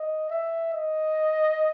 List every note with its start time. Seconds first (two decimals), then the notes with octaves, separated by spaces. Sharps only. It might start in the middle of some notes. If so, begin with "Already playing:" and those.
Already playing: D#5
0.30 E5
0.74 D#5